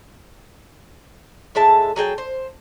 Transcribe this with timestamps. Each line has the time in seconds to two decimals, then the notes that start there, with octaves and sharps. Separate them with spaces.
1.55 A2 G#3 E5 A5
1.96 F#3 G#4 G5 A5
2.18 C5